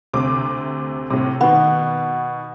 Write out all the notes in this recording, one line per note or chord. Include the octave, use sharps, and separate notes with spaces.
D2 C3 D6
A2 C3
B2 D#3 B3